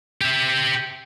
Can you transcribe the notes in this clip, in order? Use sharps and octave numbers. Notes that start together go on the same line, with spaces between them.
G4 E5